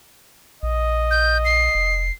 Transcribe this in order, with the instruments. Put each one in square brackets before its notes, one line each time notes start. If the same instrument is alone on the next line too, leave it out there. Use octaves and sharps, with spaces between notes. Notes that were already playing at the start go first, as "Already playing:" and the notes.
[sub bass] A#1 [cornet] D#5
[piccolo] G6
C7
[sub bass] F1